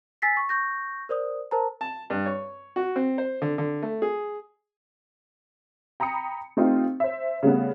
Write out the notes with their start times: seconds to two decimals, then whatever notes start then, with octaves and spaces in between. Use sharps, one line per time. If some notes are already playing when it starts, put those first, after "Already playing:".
0.22 G#5 E6 A6 B6 C7
0.37 C#6
0.49 C#6 G6 A#6
1.09 A#4 C5 D5 D#6
1.51 A#4 C5 A5 A#5
1.81 A5
2.10 G2
2.26 C#5
2.76 F#4
2.96 C4
3.18 C5
3.42 D3
3.58 D3
3.83 A3
4.02 G#4
6.00 G5 A#5 B5 D#6 C#7
6.57 A3 C4 D#4 F4 G4
7.00 C5 E5
7.43 C#3 G3 A3 B3